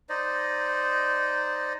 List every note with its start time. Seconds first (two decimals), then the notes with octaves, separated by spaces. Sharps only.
0.09 D#4 C5 D5 D#5